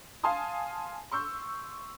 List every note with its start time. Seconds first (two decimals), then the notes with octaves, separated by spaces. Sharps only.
0.23 F5 G#5 A5 C6 D#6
1.12 C6 C#6 E6 G6